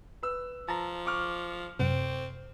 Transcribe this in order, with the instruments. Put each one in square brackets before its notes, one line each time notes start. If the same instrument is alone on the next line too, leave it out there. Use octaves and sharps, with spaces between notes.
[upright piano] B4 E6
[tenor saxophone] F3 [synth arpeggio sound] A5 A#5
[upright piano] C#6 D6 F6
[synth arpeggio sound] F#2 C3 [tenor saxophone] C4